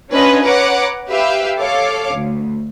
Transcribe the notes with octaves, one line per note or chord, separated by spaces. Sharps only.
C#4 D4 F4 B4 C#5 D#5
B4 C#5 F#5 A#5 D6
G4 B4 E5 F5 G5
A4 C#5 F5 D6
D2